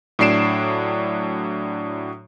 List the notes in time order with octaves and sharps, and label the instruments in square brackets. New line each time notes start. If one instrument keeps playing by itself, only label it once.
[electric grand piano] A2 F#3 D4 C7 D7 E7